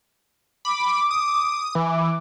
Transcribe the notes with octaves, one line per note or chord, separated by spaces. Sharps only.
B5 D6
D#6
E3 D6